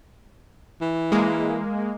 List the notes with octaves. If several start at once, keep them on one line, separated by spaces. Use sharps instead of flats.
E3
G#3 A#3